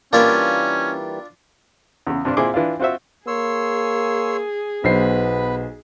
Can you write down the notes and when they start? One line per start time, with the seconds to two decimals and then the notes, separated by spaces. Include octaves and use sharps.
0.13 E3 G3 A#3 C#4 D4 F4 E5
2.07 E2 C#3
2.25 G2 C3 D4
2.37 A#2 C4 E4 G#4 C6 D6
2.54 E3 D4 E4 F4
2.80 C4 F4 F#4 C5 E5
3.27 A#3 G#4 C#5 C6 E6
4.84 B1 B3 B4 C5 B5 C7